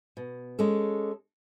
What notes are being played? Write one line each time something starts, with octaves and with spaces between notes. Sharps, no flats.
B2
G#3 C#4 A4